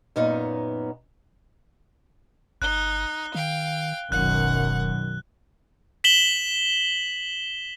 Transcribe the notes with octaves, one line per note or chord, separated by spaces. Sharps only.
F#2 A#2 B3 C#4 D#4
G1 D#4 F#6 G7
D#3 F5 G5
F1 B1 F#2 D#3 F#5 F#6
B6 E7 F#7 G7